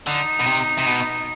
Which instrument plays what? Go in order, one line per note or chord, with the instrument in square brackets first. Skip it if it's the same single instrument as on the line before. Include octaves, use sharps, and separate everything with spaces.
[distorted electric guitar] D3 [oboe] D#4
[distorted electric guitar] B2
C3
C3
B2